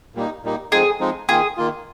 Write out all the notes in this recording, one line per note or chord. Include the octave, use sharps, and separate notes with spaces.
A#2 G3 A#3 D#4
A#2 G3 A#3 D#4
F3 G#3 C4 D#4 G#4
F3 G#3 C4 D#4
D#3 A#3 F4 G#4
D#3 A#3 F4